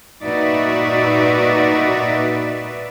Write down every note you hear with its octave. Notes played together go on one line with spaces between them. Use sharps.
A#2 D#4 F#4 B4 D5 E5